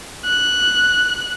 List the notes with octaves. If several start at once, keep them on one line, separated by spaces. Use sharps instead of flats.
F#6